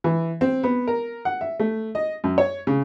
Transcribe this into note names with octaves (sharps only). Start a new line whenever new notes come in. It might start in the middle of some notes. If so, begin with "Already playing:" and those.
E3
C4
B3
A#4
F#5
E5
A3
D#5
F#2
C#5
C#3